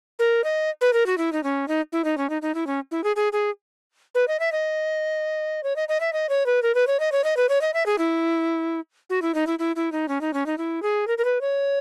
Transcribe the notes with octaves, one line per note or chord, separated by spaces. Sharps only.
A#4
D#5
B4
A#4
F#4
E4
D#4
C#4
D#4
E4
D#4
C#4
D#4
D#4
E4
C#4
E4
G#4
G#4
G#4
B4
D#5
E5
D#5
C#5
D#5
D#5
E5
D#5
C#5
B4
A#4
B4
C#5
D#5
C#5
D#5
B4
C#5
D#5
E5
G#4
E4
F#4
E4
D#4
E4
E4
E4
D#4
C#4
D#4
C#4
D#4
E4
G#4
A#4
A#4
B4
C#5